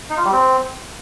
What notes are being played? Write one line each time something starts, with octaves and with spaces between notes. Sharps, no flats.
D#4
F4
G3
C4